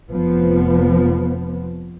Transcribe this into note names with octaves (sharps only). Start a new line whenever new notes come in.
F1 F3 B3